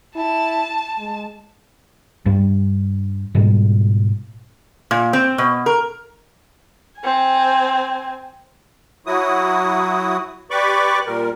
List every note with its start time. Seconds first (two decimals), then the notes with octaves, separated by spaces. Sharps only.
0.16 E4 A5
0.98 G#3
2.26 G2 G3
3.35 G#2 B2 G3
4.91 A#2
5.13 C4
5.38 B2
5.66 A#4
7.00 C4 G#5
9.06 F#3 E4 F#4 D#6
10.51 G4 B4 D5 B5 C#6 D6
11.07 A#2 G3 A#4